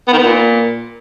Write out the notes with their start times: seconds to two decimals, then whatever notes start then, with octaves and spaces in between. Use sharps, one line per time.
0.08 B3
0.13 D#3
0.18 B3
0.24 A#2